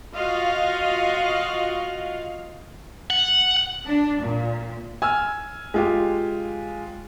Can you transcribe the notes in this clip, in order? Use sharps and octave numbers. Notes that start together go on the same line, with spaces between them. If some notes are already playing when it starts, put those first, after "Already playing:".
F4 F#4 D#5 F5
F#5
D4
A#2
G#5 E6 F6 G#6
G#3 F4 G4